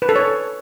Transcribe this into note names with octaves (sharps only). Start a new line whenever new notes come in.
B4
A4
C#5